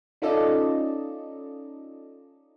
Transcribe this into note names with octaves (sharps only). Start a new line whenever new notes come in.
C#4 D#4 F4 A4 D5 D#5